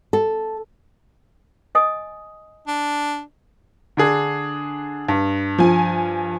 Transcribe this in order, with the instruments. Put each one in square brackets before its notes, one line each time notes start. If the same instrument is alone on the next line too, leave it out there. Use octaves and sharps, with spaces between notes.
[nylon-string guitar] A4
[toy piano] D#5 G#5 D#6
[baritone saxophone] D4
[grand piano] D3 D4 G#4
G2
[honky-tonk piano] F3 G#5